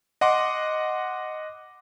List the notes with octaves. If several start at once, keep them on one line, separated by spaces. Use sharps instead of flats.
D#5 F#5 C6 D6